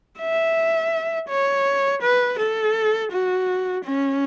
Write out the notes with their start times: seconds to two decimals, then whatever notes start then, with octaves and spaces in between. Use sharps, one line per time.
0.19 E5
1.29 C#5
2.02 B4
2.38 A4
3.12 F#4
3.85 C#4